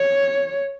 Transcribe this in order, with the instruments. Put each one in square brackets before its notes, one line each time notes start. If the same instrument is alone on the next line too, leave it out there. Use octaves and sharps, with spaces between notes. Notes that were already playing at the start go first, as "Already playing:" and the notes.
Already playing: [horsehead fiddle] C#5